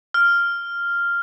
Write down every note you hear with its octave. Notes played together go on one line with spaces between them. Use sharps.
F6